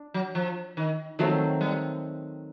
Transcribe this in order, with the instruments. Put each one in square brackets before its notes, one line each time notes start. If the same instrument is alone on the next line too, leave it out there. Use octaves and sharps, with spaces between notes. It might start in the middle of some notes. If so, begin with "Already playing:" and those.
Already playing: [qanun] D4
[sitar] F#3
F3
D#3
[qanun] D#3 F#3 A3 C4 [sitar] F3
[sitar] G3